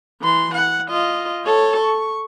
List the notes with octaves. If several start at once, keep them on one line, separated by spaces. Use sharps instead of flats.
E3 C6
F#5
F4 D#5
A4 C#5
C#6